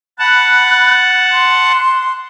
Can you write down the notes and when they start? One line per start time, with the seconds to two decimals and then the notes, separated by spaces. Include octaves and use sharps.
0.19 F#5 A5 B5 F#6
1.31 C6